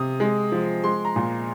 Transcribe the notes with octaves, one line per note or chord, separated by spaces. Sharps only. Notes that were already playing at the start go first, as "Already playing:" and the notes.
Already playing: C3 D#6
G#3
F3
G#3 C6
A#5
A#2